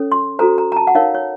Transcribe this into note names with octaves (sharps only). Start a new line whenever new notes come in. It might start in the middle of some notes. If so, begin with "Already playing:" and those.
Already playing: C#4 A4 C#5
C6
F#4 A4 C5 A#5
A#5
A#5
A5
F#5
D#4 A#4 C#5 F5
C#5